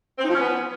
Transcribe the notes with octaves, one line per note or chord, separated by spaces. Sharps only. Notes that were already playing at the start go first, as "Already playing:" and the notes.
C4
D#4
F3
C#4
B3